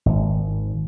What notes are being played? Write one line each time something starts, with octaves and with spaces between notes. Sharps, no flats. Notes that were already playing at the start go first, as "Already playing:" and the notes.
G#1